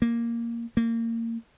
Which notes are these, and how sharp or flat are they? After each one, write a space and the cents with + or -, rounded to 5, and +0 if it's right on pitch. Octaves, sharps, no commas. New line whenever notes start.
A#3 +0
A#3 -25